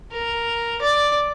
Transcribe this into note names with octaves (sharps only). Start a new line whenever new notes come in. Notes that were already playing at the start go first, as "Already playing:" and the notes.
A#4
D5